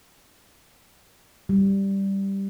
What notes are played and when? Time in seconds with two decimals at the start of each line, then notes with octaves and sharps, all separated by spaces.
1.49 G3